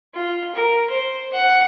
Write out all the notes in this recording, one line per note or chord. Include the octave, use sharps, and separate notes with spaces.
F4
A#4
C5
F#5